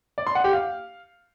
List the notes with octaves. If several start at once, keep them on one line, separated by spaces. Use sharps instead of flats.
D5
C6
F#5
G4
F5